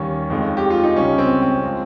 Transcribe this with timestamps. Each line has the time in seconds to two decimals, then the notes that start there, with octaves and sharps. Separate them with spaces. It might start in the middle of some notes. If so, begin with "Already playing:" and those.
Already playing: D#2 D#3 G3 C#4
0.30 F2 D#3 G#3
0.57 G4
0.70 F4
0.84 D#4
0.96 C#2 C#3 G3 C#4
1.18 C4
1.42 C4
1.63 F3 G#3